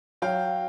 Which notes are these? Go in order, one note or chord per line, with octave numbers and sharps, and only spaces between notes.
F#3 F5 G5